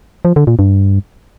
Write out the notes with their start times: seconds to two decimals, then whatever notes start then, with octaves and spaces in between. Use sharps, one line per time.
0.25 F3
0.36 D3
0.47 A#2
0.59 G2